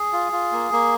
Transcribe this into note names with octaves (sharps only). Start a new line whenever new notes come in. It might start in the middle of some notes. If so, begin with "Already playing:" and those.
Already playing: G#4
F4
F4
A#3
A#3